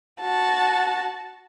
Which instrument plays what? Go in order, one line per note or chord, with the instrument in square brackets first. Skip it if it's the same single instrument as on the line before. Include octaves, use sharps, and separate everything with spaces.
[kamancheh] F#4 A5